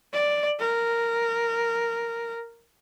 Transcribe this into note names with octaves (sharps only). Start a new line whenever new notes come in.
D5
A#4